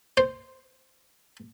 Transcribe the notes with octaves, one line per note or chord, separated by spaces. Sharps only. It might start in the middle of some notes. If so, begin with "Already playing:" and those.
C5